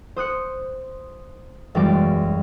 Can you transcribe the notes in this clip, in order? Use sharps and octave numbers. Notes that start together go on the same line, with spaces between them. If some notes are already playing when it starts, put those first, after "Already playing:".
C5 D#6 F#6 C#7
E1 F#2 E3 G3 G#3 D6